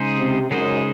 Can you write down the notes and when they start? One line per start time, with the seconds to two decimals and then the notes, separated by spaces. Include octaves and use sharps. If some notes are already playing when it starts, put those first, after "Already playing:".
Already playing: C#3 G#3 D#4 G#4 C5
0.18 C3
0.50 F#2 C#3 G#3 D#4 G#4 C5